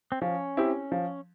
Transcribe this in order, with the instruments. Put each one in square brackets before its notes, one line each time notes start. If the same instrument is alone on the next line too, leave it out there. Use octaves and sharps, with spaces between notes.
[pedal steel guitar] C4
[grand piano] F3 [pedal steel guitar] C#4
[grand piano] C4 E4 G4
F3